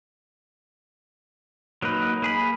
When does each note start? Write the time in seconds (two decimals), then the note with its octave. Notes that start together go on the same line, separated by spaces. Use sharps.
1.82 F#3 A#3 D#4 B4
2.22 A#3 G#4 B5